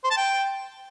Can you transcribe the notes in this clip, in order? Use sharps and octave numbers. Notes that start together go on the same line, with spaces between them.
C5
A5
G5